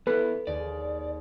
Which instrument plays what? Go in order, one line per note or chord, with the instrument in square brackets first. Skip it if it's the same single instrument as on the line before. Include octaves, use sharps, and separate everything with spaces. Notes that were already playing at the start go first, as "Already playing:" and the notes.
[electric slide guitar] B3 E4 [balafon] A4 [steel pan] B4
[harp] D#2 G#4 [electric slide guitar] D5